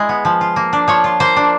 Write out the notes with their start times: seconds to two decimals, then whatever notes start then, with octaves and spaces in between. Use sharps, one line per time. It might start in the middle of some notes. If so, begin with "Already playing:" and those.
Already playing: G#3 E4
0.09 B3
0.25 F3
0.41 F4
0.56 A#3
0.73 D4
0.88 F3 C#5
1.04 F4
1.20 A#3 C5
1.36 D4